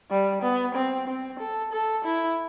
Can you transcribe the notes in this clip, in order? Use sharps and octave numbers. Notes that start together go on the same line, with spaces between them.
G3
B3
C4
C4
A4
A4
E4